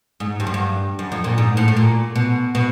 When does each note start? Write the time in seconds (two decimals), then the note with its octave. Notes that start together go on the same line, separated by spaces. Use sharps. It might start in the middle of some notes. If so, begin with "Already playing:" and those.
0.20 G#2
0.40 G2
0.47 F#2
0.54 G2
0.99 F#2
1.12 F2
1.24 A#2
1.38 G#2
1.57 A2
1.68 A2
1.77 A#2
2.16 B2
2.55 B2